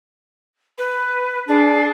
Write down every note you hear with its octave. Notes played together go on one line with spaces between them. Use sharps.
B4
D4 G#4